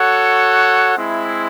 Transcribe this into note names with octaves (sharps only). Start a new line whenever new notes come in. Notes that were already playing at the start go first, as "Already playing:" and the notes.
Already playing: F#4 A4 C#5 F#5
G#3 C4 E4